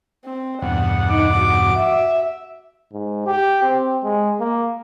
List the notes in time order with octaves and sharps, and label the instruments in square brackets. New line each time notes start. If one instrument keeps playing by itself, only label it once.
[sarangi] C4
[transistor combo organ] E2 G2 B2 [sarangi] F#5
[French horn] D#4 [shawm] D6
[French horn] F#4
[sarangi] E5
[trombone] G#2
G4
C4
G#3
A#3